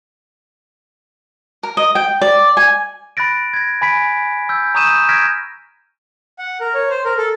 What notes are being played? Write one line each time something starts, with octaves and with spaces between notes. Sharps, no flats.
A#4
D#5
G5
D5
G#5
B5 F#6 A6 A#6 D7
G#6 A#6
G#5 B5 B6 D7
E6 G6
A#5 C#6 D#6 G6 D#7 E7
F6 G6 G#6 A#6 B6 D7
F#5
A#4
C#5
C5
A#4
A4